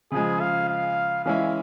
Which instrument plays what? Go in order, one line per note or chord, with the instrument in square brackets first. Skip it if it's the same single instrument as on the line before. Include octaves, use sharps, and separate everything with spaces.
[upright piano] C#3 F3 G#3 [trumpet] G#4
[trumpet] F5
F5
[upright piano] E3 G#3 C#4 E4 [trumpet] F5